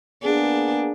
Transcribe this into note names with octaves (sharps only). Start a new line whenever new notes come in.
A#3 B3 D4 G#4